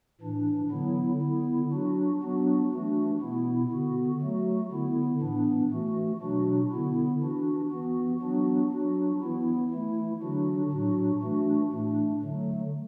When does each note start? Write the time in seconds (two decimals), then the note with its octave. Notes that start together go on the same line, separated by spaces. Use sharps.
0.21 A2 E3 D4
0.71 D3 F#3 B3 E4
1.21 D3 B3 E4
1.71 F#3 D4 F#4
2.21 F#3 B3 D4 F#4
2.71 E3 A3 D4 F#4
3.21 B2 B3 E4
3.72 D3 B3 F#4
4.21 F#3 A3 F#4
4.72 D3 B3 E4
5.21 A2 E3 B3 D4
5.72 E3 A3 F#4
6.21 B2 F#3 D4 F#4
6.71 D3 B3 E4
7.22 E3 D4 F#4
7.71 E3 B3 F#4
8.21 F#3 B3 D4 F#4
8.72 F#3 D4 F#4
9.22 E3 B3 E4
9.71 E3 A3 E4
10.22 D3 F#3 D4 F#4
10.71 A2 F#3 D4 F#4
11.21 E3 A3 D4 F#4
11.72 A2 A3 D4
12.22 D3 F#3 A3